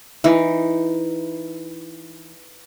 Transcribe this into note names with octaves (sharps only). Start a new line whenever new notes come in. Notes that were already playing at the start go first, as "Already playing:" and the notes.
E3 D#4